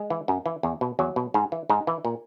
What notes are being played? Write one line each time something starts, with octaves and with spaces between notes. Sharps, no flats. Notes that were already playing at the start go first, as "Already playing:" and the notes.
Already playing: G#3
E3
F#2
E3
E2
B2
E2 F#3
B2
G#2
E3
G#2 D#4
E3
A#2